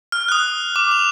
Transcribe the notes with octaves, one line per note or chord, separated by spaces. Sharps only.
F6
D#6 F#6
D6
F7